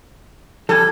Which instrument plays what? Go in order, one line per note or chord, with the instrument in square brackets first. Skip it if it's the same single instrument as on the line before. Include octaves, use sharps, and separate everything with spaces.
[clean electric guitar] F3 G3 G#5 [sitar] A4